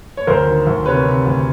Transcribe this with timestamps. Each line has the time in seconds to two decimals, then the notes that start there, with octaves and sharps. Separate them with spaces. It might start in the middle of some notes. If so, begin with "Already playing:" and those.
0.17 C#5
0.27 D2 A#4 C5
0.47 D#3
0.67 D2
0.86 C3 B4 C#5
1.06 C3
1.26 D2